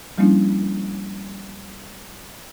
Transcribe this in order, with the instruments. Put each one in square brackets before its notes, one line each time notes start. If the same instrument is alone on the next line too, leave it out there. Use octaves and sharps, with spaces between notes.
[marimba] F3 G3 A#3 C#4 D4 E4